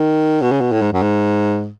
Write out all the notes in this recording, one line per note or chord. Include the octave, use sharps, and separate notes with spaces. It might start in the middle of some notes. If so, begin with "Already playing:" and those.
Already playing: D#3
B2
C#3
B2
A2
G#2
F#2
G#2